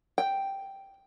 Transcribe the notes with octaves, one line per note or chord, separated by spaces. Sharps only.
G5